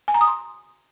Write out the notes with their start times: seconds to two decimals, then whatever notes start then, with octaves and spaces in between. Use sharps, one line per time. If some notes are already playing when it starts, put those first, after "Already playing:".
0.08 G#5
0.14 A#5
0.21 D#6
0.27 C6